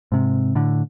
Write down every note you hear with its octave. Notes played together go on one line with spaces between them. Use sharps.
G#2 C3
A2 D3